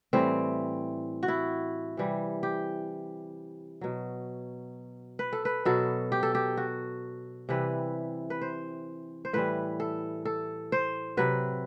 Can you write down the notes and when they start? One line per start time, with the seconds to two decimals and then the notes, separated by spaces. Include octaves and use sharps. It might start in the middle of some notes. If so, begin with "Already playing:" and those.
0.13 A2 E3 G3 C4
1.23 F#4
1.28 E4
1.97 C3 E3 G3
2.43 G4
3.81 B2 F#3
5.19 B4
5.33 A4
5.45 B4
5.65 B2 F#3 A4
6.12 G4
6.23 A4
6.35 G4
6.57 F#4
7.49 C3 E3 G3 B4
8.30 B4
8.41 C5
9.25 C5
9.33 A2 E3 G3 B4
9.80 A4
10.25 A4
10.72 C5
11.17 C3 F#3 B4